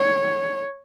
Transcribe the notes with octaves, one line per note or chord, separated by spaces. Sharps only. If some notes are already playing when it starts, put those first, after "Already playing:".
Already playing: C#5